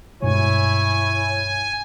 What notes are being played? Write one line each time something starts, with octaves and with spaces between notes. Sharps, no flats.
G2 B2 G#3 E4 C#5 G#5